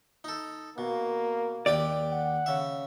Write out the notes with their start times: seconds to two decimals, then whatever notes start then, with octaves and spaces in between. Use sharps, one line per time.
0.24 D#4 A4
0.78 B2 A#3
1.66 D#2 G4 D5 G5
2.12 F#5
2.46 C#3 E5